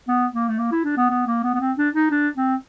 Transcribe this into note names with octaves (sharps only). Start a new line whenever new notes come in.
B3
A#3
A3
A#3
E4
D4
B3
B3
A#3
B3
B3
C4
D4
D#4
D4
C4